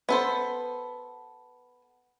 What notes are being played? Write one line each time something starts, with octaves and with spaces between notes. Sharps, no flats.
B3 A4 C5